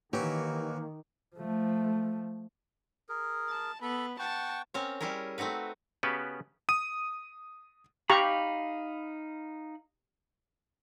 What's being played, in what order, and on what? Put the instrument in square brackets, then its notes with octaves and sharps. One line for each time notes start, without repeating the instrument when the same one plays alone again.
[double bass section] D#3 [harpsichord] E3 F#3 F#4 [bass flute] A#3 [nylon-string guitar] G4
[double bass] F3 A3
[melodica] G#4 A#4
[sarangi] A5
[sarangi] B3 [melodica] A4 B5
[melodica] F#5 G5 C#6 [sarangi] A5
[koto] C4 C#4 A#4 C#5
G3 C#4 E4 G#4 A#4
A3 C4 D#4 F#4 B4
[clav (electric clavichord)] C#3 B3 C#4 F#4 G4 B4
[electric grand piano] D#6 D#7
[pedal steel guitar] D#4 F5 B5 [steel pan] G4 A#5 C#6